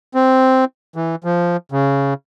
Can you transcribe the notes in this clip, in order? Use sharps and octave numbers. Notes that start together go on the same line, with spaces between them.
C4
E3
F3
C#3